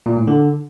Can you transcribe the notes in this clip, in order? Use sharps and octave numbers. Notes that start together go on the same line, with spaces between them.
A#2
A2
D3